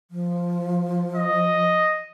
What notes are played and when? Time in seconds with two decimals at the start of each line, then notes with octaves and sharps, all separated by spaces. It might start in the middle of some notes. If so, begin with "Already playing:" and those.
0.11 F3
1.15 D#5